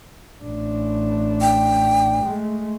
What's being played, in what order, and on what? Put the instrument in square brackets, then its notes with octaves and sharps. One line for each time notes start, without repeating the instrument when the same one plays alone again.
[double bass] A1 D4
[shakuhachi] G5
[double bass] G#3 A3